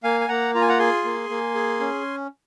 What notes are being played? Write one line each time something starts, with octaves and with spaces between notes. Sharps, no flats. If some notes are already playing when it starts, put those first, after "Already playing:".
A#3 F5 G#5
G#5
A#3 F#5 A#5
F4 A#5
G#5
F#5 A#5
G#4 G#5 C6
A#3
A#3
G#4
C#4